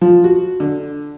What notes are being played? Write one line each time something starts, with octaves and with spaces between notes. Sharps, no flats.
F3
F#4
D3